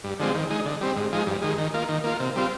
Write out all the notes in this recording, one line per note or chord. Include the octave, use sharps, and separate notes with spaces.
G2
D3 F3 G#3 C4
D#3
G#3 D#4
D3
G3 C4
G#2
F3 G#3 D#4
G2
D#3 G#3
D#3
A#3 F4
D#3
A#3 F4
C3
G3 C4 F4